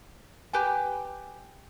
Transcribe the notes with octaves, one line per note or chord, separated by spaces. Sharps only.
G4 B4 G#5